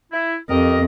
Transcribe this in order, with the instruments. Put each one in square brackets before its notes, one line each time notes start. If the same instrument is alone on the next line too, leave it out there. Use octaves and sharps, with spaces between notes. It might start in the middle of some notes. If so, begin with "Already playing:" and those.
[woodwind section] E4
[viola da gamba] F2 [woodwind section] G4 A#4 D#5